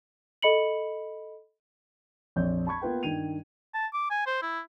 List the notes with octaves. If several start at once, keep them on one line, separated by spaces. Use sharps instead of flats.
A4 D#5 B5 C#7 F#7
A#1 F2 C4 C#5 D5 G6
A5 B5 C#6 G#6
A#3 B3 F4 B4 G5
G2 D#3 G5 D#7 F7
A5
D6
G#5
C5
E4